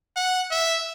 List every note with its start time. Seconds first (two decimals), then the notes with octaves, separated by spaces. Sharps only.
0.16 F#5
0.51 E5